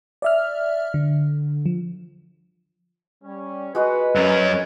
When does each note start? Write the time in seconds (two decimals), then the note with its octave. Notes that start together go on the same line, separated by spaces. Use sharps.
0.22 D5 E5 F6
0.94 D3
1.66 F3
3.24 G3 C#4
3.75 G#3 F#4 B4 D#5
4.15 F#2 C#4